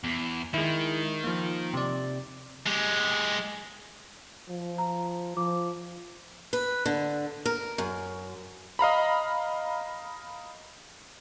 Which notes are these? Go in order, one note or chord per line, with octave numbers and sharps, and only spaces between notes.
E2
D#3 G#3 E4
F3 A#3
C3 D5
G#3 G4
F3
A#5
F3 D6
B4
D3
A#4
F#2
D#5 F5 A#5 B5